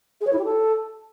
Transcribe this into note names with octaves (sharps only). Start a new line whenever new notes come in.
G#4
C#5
E4
G4
A4